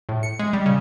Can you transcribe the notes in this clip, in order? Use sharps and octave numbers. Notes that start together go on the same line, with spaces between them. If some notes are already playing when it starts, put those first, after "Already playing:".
A2
C#7
G#3
G3
C#3